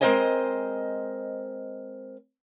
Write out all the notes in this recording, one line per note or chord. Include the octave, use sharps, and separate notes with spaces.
G#3 C4 A#4 C5 D#5 G#5